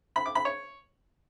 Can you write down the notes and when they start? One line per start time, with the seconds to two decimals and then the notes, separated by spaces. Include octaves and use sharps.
0.16 B5
0.26 D6
0.35 B5
0.45 C#5